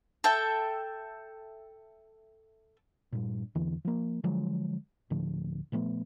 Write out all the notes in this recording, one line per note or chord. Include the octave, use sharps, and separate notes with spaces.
A4 E5 G5
G2 A#2
E2 D3 E3
F3 A#3
D3 F3 F#3 G#3
D1 A2 D3 F3
A#2 F3 A3 B3